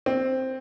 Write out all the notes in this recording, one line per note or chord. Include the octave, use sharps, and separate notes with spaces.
C4